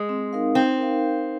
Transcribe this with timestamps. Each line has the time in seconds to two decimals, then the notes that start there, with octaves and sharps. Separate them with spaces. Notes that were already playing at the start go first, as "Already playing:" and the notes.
Already playing: G#3
0.09 C4
0.33 D#4 A#4 F5
0.55 C4 D#4
0.78 A#4 F5